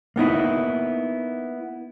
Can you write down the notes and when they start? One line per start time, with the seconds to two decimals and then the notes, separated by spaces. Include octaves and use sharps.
0.16 A#3 B3 D#4 E4